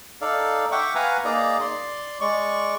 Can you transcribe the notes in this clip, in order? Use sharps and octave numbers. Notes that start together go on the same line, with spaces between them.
D#4 A4 D5 F5
E5 F#5 G5 C#6 D6
B4 F5 F#5 G#5 A#5
A#3 D#4 G#4 D5 A#5
D5 C6
G#3 D5 C#6